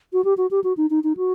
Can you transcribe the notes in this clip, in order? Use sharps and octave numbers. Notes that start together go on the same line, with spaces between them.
F#4
G4
F#4
G4
F#4
D#4
D#4
D#4
F#4